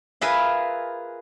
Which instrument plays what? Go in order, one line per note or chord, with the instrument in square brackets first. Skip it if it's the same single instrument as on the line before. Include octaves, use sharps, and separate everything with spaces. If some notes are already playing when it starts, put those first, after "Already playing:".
[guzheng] F4 G#4 A#4 B4 E5 G#5